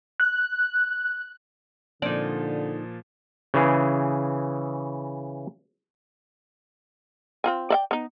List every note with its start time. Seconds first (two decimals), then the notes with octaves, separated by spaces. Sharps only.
0.20 F#6
2.02 A#2 D3 F3 D#4 D5
3.54 C#3 E3 G#4
7.44 C4 F4 G#5
7.70 D5 E5 G5
7.91 B3 D#4